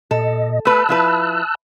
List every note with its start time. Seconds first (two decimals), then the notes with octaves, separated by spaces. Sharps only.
0.11 A#2 A4 D#5
0.65 A3 B4 A5 E6 F#6
0.89 F3 E4 B4